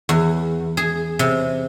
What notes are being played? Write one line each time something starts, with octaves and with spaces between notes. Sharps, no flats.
E2
G#4
C3